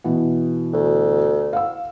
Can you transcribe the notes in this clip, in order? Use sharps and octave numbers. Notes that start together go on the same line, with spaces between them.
B2 E3 B3
D2
F5 F#5 E6